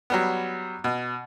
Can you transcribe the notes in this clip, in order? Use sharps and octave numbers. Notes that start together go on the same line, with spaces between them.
F#3 G3 B3
B2